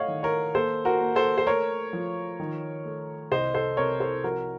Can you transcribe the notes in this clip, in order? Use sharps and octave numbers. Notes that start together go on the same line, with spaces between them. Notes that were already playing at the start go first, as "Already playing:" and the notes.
Already playing: A3 C#5 D#5 F5 F#5
D#3
A#4 C#5
A#3 A4 C5
F#4 A#4
A#3
A4 C5
C5
A3 A#4 C#5
F3
D#3
A3
C2 C5 D#5
A4 C5
C3 A#4 C#5
A4 C5
F3 F#4 A#4